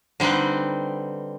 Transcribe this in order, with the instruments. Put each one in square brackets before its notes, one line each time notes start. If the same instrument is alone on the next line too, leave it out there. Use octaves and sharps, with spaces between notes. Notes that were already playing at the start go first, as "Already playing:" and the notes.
[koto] D3 G3 C4 D#4 B4